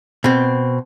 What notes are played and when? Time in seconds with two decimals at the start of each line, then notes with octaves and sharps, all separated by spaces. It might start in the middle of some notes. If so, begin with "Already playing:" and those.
0.24 B2 C4